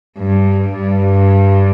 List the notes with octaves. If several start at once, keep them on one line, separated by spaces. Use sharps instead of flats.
G2
G2